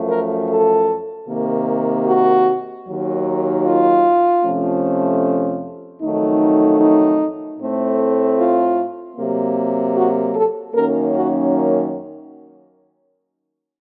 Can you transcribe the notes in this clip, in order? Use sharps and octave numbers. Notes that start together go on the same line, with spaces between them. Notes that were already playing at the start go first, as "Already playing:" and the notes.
Already playing: F#2 F3 A3
A#4
A4
C3 D#3 A#3
F#4
D#2 D#3 F#3
F4
F2 C3 F3 A3 C#4
F2 D#3 F#3 A3 D#4
D#4
A2 A3 C4
F4
C3 F#3 A#3
F#4
A4
F#2 D#3 F#3 A#3 C#4 A#4
F#4